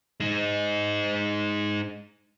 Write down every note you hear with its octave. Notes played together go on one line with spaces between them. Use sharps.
G#3 D#4